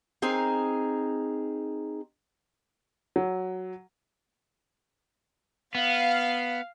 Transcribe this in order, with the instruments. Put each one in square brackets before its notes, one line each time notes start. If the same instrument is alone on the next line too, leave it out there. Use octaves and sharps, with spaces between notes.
[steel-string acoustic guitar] C4 D#4 G#4 A#4
[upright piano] F#3
[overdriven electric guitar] B3 [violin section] F5